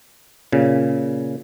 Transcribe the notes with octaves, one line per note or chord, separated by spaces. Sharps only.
A#2 C#3